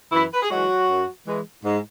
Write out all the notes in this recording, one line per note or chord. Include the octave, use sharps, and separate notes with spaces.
F#2 E3 E4
B4
G#4
E3 F#3 G#3 F#4
F#2
E3 G#3
G#2